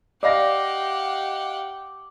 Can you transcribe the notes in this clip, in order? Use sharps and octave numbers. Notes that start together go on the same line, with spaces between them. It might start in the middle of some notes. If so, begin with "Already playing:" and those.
G4 D5 D#5 F5 F#5 D6 A#6